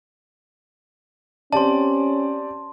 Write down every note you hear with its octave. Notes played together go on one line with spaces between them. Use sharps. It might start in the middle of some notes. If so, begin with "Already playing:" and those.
C4 C#4 G4 D5 A5 C6